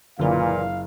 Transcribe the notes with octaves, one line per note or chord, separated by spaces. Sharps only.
F#1 A#2 D3 E3 F4 F5